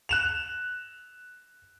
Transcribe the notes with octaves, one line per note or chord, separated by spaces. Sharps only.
F#6 E7 F7